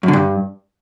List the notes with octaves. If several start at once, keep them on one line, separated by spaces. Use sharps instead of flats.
F#2
D3
G2